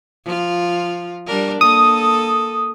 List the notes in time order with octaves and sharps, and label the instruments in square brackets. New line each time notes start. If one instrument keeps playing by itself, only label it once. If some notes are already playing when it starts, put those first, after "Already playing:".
[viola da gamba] F3 F4
G3 D4 A#4
[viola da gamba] A#3 A4 [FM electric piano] D#6